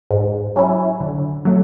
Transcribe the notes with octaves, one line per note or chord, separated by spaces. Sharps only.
G#2
F#3 C#4 E4
D3
F#3 A3